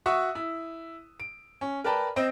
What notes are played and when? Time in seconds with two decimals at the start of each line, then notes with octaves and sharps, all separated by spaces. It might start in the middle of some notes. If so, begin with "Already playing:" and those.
0.06 F#4 E5 F#5 C#6 D#6 E6
0.35 E4
1.20 D7
1.61 C#4
1.84 A#4 B4 D5 G5 A5 B5
2.16 C4 C5 D#5